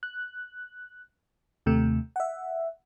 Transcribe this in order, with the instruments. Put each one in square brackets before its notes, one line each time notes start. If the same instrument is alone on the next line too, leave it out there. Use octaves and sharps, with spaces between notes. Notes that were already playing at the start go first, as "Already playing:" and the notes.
[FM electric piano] F#6
D#2 C3 A3
E5 F#5